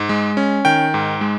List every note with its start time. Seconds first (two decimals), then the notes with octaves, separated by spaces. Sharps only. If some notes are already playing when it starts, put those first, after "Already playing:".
Already playing: G#2
0.09 G#3
0.37 C#4
0.65 D#3 G5
0.94 G#2
1.21 G#3